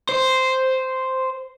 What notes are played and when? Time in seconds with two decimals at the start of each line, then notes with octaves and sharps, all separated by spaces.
0.09 C5